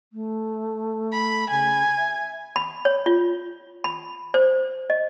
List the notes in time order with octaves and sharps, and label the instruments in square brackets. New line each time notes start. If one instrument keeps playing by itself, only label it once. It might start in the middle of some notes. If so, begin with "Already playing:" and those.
[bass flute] A3
[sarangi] B5
[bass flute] C#3 [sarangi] G#5
[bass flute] E5
[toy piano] B5
C#5
F4
B5
C5
D#5